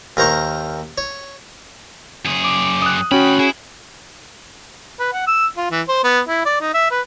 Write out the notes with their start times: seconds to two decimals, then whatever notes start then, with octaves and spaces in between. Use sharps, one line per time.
0.17 D#2 A#4 C5 A#5 C#6
0.98 C#5
2.25 F#2 G#4
2.44 D6
2.82 D#6 F#6
3.11 D2 C#4 F#4 G5 B5
3.39 E4 G#4
4.99 B4
5.13 F#5
5.27 E6
5.57 F4
5.71 E3
5.88 C5
6.04 B3
6.28 E4
6.45 D5
6.61 D#4
6.74 E5
6.91 B4